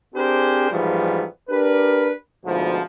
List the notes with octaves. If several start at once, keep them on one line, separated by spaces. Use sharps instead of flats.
C4 D4 G4 G#4 A#4 C5
G#2 E3 F3 G3 A3 B3
D4 G4 A#4 B4
D2 G#2 B2 F3